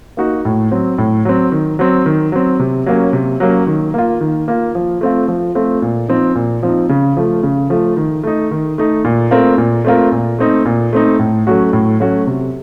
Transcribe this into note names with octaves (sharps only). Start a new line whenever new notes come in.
A#3 D#4 F#4
A2
F#3 C4
A2
F#3 C4
D#3
F#3 C4
D#3
F#3 C4
C3
F#3 A#3 C#4
C3
F#3 A#3 C#4
D#3
A#3 F4
D#3
A#3 F4
F3
A3 C4 F4
F3
A3 C4 F4
A#2
F3 C4 D#4
A#2
F3 C4 D#4
C#3
F3 A3
C#3
F3 A3
D#3
A3 D#4
D#3
A3 D#4
A#2
A3 C4 F4 A#4
A#2
A3 C4 F4 A#4
A#2
A3 C4 D#4
A#2
A3 C4 D#4
A2
F#3 A3 C#4 F#4
A2
F#3 A3 C#4 F#4
C3